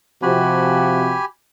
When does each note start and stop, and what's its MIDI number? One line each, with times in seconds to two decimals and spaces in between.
0.23 1.14 48
0.23 1.14 53
0.23 1.25 66
0.23 1.25 67
0.23 1.25 80
0.23 1.25 83